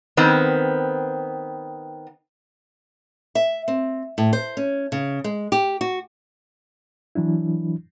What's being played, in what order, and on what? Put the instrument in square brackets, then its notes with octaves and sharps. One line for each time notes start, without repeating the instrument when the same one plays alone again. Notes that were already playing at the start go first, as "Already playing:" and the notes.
[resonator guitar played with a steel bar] D#3 B3 C4
[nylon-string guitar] E5
C4
A2
C5
C#4
C#3
G#3
G4
F#4
[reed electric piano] E3 F#3 D4 E4